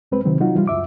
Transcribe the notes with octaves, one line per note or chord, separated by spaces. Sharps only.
C2 G#3 C4 B4
C3 D#3 F#3 C4
F#3 D#4 F4 F#4
E3 G3 F4
C#2 F#2 E5 D6